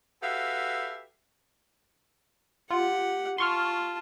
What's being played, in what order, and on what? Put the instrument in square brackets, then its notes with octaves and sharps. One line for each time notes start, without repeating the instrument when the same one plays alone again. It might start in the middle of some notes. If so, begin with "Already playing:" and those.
[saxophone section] F#4 G4 A4 B4 E5 F5
[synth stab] F4 [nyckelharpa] G4 F#5
[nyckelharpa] F4 A5 [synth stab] C6 C#6 F6